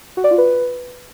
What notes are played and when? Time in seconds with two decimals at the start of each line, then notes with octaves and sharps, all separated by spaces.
0.17 F#4
0.24 D5
0.31 F4
0.38 B4